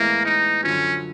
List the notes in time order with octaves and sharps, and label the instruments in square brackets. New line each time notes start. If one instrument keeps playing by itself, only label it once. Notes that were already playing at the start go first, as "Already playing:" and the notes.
Already playing: [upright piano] A2 E3 G#3 B3 E4 [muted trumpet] A#3
[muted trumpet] D#4
[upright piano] F#2 D3 F3 [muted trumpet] C#4